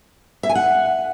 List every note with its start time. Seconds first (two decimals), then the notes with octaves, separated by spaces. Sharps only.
0.43 E5
0.49 G#5
0.55 F#5